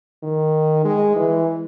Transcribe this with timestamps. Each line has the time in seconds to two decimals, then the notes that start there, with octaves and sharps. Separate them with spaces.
0.23 D#3
0.84 G#3
1.15 E3